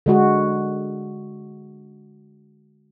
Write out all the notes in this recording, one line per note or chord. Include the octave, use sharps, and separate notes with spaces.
D3 G#3 F#4